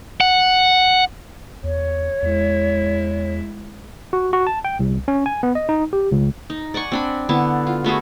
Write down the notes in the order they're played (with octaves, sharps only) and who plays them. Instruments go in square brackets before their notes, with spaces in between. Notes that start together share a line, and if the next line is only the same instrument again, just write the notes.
[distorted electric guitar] F#5
[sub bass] E2 [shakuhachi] C#5
[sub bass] E2 [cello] G#3 E4
[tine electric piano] F#4
F#4
A5
G5
C2
C#4
G#5
B3
D#5
D#4
G4
C#2
[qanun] D#4
D5 F#5 G#5 C#6
C4 D4 B5
D3 B3 E4 A5
F4
A3 B3 F#4 G#4